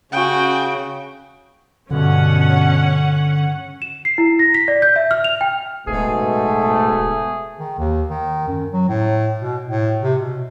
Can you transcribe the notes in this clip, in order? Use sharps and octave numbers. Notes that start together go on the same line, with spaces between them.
C#3 C#4 F#4 G5
G2 B2 D3 C#4 F#5
E7
C7
E4
A#6
B6
D5
G6
E5
F6
F7
G5
D1 G#2 B2 A3 G#4
D#3
D#2
D#3
F#2
F#3
A2
B2
A2
C3
B2